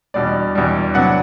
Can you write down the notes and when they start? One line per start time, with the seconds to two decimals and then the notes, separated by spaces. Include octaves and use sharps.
0.14 E2 B2 G3 D4 D5
0.55 E2 B2 G3 D4
0.94 C3 F#3 B3 D4 F#5